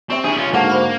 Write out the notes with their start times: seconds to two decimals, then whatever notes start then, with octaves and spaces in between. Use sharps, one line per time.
0.10 C4 G4 D5 E5
0.24 D4 E4 G4 G#4 E5
0.37 C#4 F4
0.54 G#2 D3 A#3 D#4 F#4 F#5 A5
0.69 C5 B5 C6